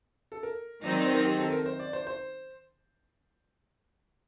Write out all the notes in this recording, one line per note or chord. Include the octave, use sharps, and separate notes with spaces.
A4
A#4
D#3 F#3 C4 D#4 D5
D5
C5
A#4
G4
A4
A#4
C5
D5
C5
C5